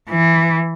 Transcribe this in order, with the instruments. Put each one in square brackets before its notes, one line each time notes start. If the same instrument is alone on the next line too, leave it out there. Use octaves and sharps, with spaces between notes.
[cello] E3